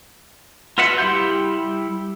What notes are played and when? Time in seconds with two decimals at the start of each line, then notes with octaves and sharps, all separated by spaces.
0.78 F4 F#4 B4 E5 F#5
0.98 G3 E4 G4 C6 G6